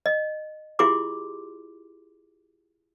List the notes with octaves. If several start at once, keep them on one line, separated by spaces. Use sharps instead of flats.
D#5
E4 F4 G4 G#4 C6 D6